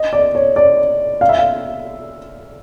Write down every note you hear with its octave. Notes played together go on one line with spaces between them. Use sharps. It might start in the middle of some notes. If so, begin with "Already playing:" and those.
Already playing: D#5
D5
C#5
D5
F5
E5
F5